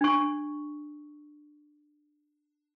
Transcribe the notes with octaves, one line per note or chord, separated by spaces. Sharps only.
D4 C#6